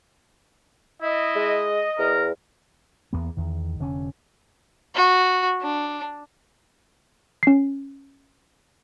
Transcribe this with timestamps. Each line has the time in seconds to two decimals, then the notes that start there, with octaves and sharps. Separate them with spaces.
1.02 E4 D#5
1.36 G#3
1.98 E2 A#4
3.13 E2 A#3 B3
3.37 E2 D#3
3.79 F1 D3 C#4
4.95 F#4
5.61 D4
7.43 C#4 C7